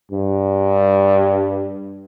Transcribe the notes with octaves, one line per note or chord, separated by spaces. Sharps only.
G2